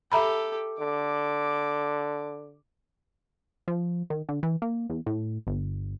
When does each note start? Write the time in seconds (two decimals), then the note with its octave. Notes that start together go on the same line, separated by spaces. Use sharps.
0.12 G4 A4 E5 A#5 B5
0.79 D3 D6
3.68 F3
4.10 D#3
4.29 D3
4.43 E3
4.62 A#3
4.90 E2
5.06 A2
5.47 G1